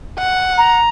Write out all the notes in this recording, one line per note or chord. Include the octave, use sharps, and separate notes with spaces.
F#5
A#5